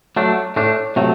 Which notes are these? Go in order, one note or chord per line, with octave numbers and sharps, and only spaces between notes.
F#3 A3 D4
A2 A3 D4
C3 F#3 A3